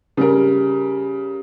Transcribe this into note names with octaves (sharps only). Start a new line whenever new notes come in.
C#3 G3 A#4